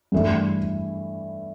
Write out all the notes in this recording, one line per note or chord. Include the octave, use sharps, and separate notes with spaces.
G2 E3 A3